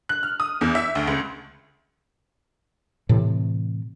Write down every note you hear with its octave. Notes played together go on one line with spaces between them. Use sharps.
F#6
F6
D#6
E2
E5
D2
C#2
A2 C3 E3